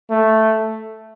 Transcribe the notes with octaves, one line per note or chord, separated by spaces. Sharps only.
A3